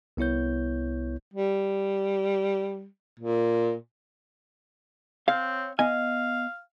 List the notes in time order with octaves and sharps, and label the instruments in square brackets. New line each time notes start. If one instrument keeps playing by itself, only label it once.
[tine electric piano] C2 B3 E4 C#5 G6
[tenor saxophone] G3
A#2
[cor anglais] C4 [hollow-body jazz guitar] C#5 F5
[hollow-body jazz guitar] B3 D#5 G#5 [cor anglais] F5